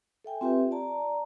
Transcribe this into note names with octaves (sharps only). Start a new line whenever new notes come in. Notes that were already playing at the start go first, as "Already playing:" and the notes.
A4 E5 G5 G#5
C4 F4 G4 B4 E5
D5 A5 A#5